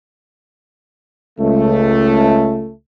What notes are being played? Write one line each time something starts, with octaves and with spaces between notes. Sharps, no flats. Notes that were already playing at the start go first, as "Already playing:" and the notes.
C#2 A3